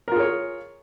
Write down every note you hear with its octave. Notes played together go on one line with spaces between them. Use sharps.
F4 G#4 A#4 C#5